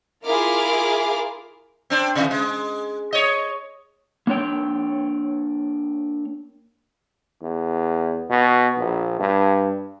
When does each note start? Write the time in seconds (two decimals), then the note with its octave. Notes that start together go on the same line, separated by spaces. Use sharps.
0.25 E4 F4 G#4 A#4 D6 F6
1.90 C4 D4
2.15 C3 E3
2.31 G#3
3.13 C#5 D#5
4.27 A#3 D4 C#5 G5
7.42 E2
8.30 B2
8.78 A#1
9.20 G2